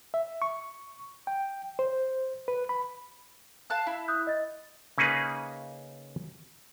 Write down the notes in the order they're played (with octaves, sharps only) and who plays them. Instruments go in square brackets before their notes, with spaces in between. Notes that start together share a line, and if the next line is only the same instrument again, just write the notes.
[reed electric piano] E5
C#6
G5
C5
B4
B5
[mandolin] F5 A5 F#6
E4
[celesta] D#6 F#6 G6
D#5 A6
[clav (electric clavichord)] C#3 A#3 C#4 D#4 G#4 B4